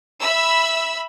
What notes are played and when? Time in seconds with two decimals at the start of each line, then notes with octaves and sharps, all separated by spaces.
0.21 E5 B5 E6